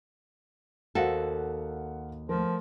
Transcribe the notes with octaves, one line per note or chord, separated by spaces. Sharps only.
D#2 F#4 A4 C5 F5 F#5
F3 A3 A#4